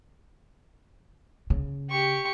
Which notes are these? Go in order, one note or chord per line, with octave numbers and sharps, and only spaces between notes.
C#3
G4 C#6